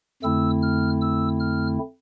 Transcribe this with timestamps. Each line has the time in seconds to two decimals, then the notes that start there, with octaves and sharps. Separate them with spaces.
0.23 F2 D3 A3 C4 E4 E6
0.63 F6
1.01 E6
1.40 F6